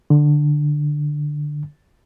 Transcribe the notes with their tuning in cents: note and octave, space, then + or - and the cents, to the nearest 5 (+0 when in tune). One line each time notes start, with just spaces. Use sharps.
D3 +10